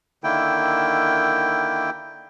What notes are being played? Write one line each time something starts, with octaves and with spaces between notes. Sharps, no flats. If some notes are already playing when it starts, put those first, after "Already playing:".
D3 D#3 A#3 E4 G5